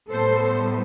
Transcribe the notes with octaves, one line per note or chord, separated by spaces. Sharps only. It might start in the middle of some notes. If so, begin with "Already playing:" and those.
A2 G3 B3 A4 C5